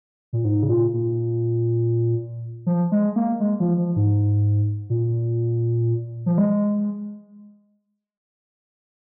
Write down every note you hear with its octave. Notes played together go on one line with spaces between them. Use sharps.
A#2
G#2
C#3
A#2
A#2
F3
G#3
A#3
G#3
F3
F3
G#2
A#2
F3
G#3